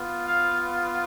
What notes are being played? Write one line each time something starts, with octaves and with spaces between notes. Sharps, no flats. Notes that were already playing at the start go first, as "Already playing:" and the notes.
Already playing: B3 F4
F5